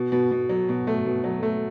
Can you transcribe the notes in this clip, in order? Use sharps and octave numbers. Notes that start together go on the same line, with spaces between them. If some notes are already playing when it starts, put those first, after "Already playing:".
Already playing: B2
B2
B2
F#3
B2
A3
B2
F#3
A3